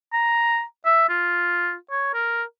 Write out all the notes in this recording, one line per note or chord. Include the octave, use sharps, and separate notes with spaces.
A#5
E5
F4
C#5
A#4